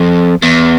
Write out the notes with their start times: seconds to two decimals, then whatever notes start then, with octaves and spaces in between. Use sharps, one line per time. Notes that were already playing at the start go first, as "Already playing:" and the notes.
Already playing: F2
0.42 E2